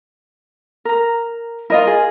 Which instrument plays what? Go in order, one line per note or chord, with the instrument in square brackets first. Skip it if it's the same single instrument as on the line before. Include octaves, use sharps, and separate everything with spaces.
[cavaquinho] A#4 A#5
[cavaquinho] E4 F4 [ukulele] A#4 D#5
[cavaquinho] G#4